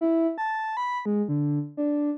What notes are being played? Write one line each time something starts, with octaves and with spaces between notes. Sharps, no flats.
E4
A5
B5
G#3
D3
D4